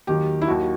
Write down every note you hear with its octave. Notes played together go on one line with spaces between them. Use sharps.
D#2 D#3 F#3 G4
E4
D#2 D#3 F#3 F#4